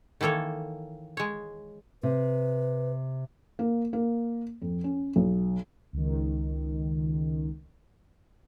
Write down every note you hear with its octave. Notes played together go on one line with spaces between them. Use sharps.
D#3 E3 A#3 A4 C#5
G#3 C#5
C3 B4
A#3
A#3
F2
C#4
B1
C#2 D#3